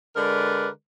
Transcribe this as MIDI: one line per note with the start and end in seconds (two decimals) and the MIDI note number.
0.16 0.68 50
0.16 0.68 56
0.16 0.68 70
0.16 0.68 71
0.16 0.68 74